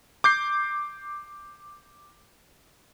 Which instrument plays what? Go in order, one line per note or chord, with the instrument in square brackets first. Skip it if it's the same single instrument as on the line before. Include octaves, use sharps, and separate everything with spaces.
[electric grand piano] D6 G6 C7